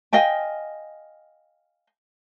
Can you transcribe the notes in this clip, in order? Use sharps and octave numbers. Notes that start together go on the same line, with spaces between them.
D#5 F5 G5 G#5